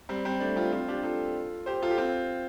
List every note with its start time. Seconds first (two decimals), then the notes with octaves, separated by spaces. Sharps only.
0.09 G3 C4
0.25 G3 C4
0.40 A3 D4
0.56 C4 F4
0.72 C4 F4
0.88 D4 G4
1.03 F4 A4
1.66 G4 C5
1.82 F4 A4
1.91 G4
1.98 C4 F4